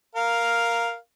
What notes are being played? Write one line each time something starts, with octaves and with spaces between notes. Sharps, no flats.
A#4 F5